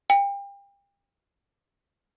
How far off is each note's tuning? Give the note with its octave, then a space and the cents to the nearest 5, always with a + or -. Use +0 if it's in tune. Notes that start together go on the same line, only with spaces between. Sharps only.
G5 +35